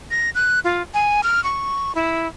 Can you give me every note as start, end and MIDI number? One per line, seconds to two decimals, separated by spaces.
0.11 0.30 94
0.35 0.60 90
0.64 0.82 65
0.94 1.21 80
1.23 1.43 89
1.44 1.95 85
1.95 2.28 64